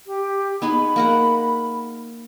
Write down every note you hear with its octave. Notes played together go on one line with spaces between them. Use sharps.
G4
B3 D#4 G#4 B5
A#3 A#4 F#5